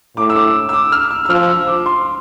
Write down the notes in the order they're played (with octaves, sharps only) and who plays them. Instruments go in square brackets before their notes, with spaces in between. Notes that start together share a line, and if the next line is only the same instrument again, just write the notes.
[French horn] A2 [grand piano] D6
[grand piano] E6
D6
E6
D6
F6
E6
E6
[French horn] F3 [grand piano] F6
[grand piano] E6
D6
C6